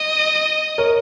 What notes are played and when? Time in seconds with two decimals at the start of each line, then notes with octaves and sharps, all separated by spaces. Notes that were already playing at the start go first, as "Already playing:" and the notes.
Already playing: D#5
0.78 A#4 C#5